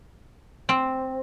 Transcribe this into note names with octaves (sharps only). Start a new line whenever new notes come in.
C4